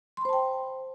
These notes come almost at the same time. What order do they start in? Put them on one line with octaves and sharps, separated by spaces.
C6 B5 C5 A5 G5